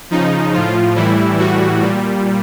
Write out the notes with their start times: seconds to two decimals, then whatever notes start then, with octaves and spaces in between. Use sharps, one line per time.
0.11 C#3 F3 D#4
0.54 A2 F3 F4
0.96 A2 E3 G3 E4
1.39 A2 E3 G3 F#4
1.82 A#2 G3